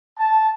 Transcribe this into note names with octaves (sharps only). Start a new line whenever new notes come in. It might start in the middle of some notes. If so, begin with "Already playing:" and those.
A5